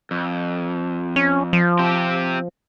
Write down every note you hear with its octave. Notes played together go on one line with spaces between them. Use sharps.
F2
C#4
F3
C4 G4